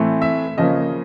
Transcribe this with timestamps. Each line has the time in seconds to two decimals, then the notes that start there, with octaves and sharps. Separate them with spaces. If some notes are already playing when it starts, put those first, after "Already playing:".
Already playing: A2 E3 A3 C4
0.22 E5
0.57 C#3 F3 A#3 C#4 D#5